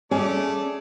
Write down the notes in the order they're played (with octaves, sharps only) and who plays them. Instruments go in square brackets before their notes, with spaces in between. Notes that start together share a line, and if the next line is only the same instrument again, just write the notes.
[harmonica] A3 D5 A5 [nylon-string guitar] C#4 [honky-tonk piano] G#4